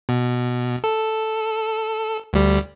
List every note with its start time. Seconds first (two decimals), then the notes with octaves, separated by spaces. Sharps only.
0.09 B2
0.84 A4
2.33 D2 G3